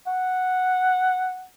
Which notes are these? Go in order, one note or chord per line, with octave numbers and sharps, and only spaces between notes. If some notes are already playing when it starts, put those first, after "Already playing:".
F#5